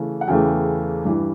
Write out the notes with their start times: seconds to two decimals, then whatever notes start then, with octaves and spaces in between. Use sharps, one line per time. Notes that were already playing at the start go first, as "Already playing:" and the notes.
Already playing: C#3 E3 A3
0.21 F#5
0.28 E2 C#3 E3 A3 G5
1.05 G2 E3 G3